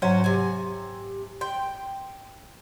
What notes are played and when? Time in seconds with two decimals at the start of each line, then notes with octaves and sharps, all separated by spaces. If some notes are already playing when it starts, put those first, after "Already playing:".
0.02 G#2 F#3 C#4 F#4 C5
0.24 C3 G#5
1.41 G5 C6